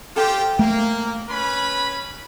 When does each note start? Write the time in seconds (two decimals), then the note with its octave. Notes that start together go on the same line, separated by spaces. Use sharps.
0.16 F4 G4 A4 C5 G5
0.59 A3 A#3
1.28 C#4 B4 B5